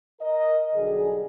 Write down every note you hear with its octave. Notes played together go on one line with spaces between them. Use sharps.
A#4 D#5
B1 D3 G3 G#4